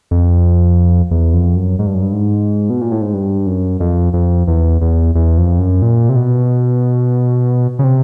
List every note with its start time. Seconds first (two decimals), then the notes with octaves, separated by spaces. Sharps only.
0.11 F2
1.11 E2
1.34 F2
1.56 F#2
1.79 G#2
1.87 G2
1.94 F#2
2.02 G2
2.13 G#2
2.70 B2
2.81 A#2
2.91 A2
3.02 G#2
3.14 G2
3.47 F#2
3.80 F2
4.13 F2
4.47 E2
4.81 E2
5.15 E2
5.38 F2
5.59 F#2
5.82 A#2
6.09 C3
6.16 B2
7.79 C#3
7.84 C3